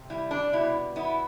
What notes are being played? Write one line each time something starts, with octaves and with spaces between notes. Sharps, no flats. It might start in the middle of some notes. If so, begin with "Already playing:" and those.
Already playing: C3
G3 E4
D4
B2 E4
B3 E4